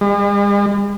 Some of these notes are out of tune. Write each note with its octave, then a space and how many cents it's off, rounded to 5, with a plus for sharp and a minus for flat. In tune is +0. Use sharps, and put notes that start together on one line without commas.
G#3 -45